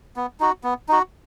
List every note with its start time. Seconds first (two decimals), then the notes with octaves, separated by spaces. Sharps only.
0.16 B3
0.40 D#4 F#4
0.64 B3
0.89 D#4 F#4